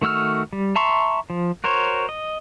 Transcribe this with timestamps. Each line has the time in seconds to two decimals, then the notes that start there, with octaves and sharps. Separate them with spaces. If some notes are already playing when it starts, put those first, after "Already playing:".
0.02 D#3 A3 F#4 E6 F6
0.53 G3
0.76 E5 A5 A#5 C6 C#6
1.30 F3
1.64 F#4 A#4 C5 C#5
2.09 D#5